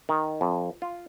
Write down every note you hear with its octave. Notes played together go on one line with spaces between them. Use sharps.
D#3
F2
F4